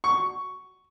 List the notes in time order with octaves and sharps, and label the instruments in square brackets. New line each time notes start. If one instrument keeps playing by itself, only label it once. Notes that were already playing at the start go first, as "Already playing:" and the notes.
[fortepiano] C#6